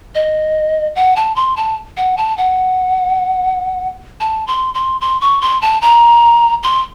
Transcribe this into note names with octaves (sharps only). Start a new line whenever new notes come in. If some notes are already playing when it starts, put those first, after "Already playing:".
D#5
F#5
A5
C6
A5
F#5
A5
F#5
A5
C6
C6
C6
C#6
C6
A5
A#5
C6